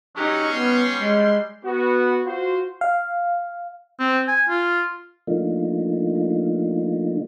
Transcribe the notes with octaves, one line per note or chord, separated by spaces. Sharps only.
F#3 C#4 D#4 G4
G3 B3 C6
G#3
B3 F#4
F4 F#4 C5
F5
C4
G#5
F4
F3 A3 A#3 D4 D#4 F4